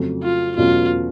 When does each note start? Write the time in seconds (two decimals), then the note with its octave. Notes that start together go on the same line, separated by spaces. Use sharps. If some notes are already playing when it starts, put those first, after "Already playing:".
Already playing: F2 C#3 F#3 A3
0.23 F4
0.57 E2 B2 F#3 A3 C#4 F4